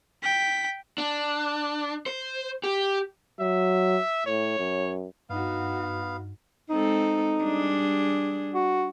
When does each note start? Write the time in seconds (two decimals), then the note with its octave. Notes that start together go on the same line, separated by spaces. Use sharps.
0.23 G5 B6
0.98 D4
2.06 C5
2.63 G4
3.40 F#3 E5
4.26 A2 C#5
4.59 F#2
5.30 G2 B3 D#4 F#4 F5
6.70 G#3 C4 D#4 A4
7.41 G3 D4 G#4
8.54 F#4